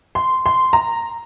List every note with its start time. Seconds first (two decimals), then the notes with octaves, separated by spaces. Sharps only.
0.15 C6
0.46 C6
0.73 A#5